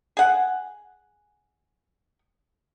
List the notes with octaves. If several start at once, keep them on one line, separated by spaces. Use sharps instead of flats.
G#4 F#5